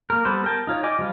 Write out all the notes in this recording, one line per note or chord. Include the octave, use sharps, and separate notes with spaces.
A#3 A#4
G3 B3 A4 B4 C5
A#4 G5 A5
D#4 F4 C#5
D5 D#5 G5 G#5 D6
F3 G3 F4